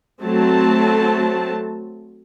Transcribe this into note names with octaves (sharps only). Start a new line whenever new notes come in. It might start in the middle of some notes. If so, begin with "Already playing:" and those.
F#3 A3 C4 A5